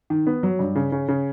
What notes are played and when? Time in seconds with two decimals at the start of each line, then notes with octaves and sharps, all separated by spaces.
0.10 D#3
0.27 B3
0.43 F#3
0.59 G2
0.76 C#3
0.92 C#3
1.08 C#3